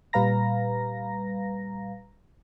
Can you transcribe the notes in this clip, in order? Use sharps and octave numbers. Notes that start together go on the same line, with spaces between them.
A#2 G3 B4 F5 A#5 A#6